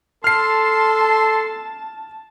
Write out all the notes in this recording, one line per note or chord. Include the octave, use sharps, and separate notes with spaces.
A4 A5 C6 F6 C7